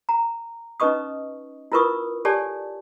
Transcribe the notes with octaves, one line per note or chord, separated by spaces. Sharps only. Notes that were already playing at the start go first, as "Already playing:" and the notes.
A#5
C#4 D#4 B4 D#5 C#6 D#6
E4 F4 A#4 B4 C#6 D#6
G4 A4 C#5 D5 G#5 A5